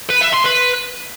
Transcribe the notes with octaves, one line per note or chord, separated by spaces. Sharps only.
B4
E5
C6
B4